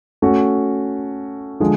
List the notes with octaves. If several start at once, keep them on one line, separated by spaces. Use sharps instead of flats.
A3 C#4 F#4
D3 F3 G#3